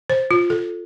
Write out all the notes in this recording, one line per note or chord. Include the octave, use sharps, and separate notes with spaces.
C5
F4
A4